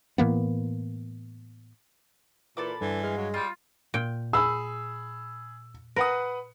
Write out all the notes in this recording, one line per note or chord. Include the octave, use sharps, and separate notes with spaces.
A2 E3 A#3 B3
A#2 E3 A4 B5 D6
G2 D3 E3
G#3 F5
F#3
G3 F4
A#2 G5
G#4 B5 E6
A#4 B4 F#5 D#6